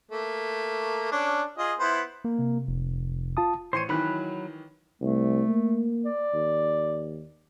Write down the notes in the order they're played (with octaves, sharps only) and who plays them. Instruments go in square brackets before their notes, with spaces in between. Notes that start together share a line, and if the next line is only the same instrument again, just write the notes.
[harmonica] A3 A#3
C#4 D4
F4 G#4 D#5
B3 E4 C5
[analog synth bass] A#3
[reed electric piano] C3
[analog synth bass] F1
[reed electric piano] F4 A5 D#6
[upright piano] A1 C6 D#7 [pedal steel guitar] C5 C#5
[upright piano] D#3 E3 [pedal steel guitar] F#3 B5 F#6
[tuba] C2 [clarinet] A3
[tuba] A#3
[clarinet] D5
[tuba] D#2